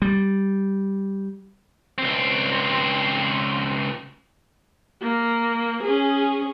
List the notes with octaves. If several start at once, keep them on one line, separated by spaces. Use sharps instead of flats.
G3
C#2 C4
A#3
C#4 G#4